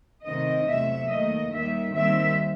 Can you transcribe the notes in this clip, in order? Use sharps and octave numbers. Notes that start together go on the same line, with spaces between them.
C3 D#3 A3 C4 D#5
E2 C3 F#3 A3 E5
D#2 D#3 A3 D#5
D#2 D#3 G3 E5
D#2 D#3 G3 C4 E5